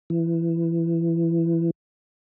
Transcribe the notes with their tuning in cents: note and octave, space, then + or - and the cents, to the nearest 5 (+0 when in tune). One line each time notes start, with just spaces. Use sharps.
E3 +20